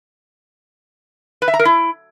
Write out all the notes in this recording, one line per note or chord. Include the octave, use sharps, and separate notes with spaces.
B4
E5
A#5
A#4
E4